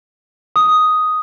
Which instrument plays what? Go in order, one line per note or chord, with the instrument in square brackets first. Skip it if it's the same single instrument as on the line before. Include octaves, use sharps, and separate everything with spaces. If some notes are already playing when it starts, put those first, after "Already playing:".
[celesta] D#6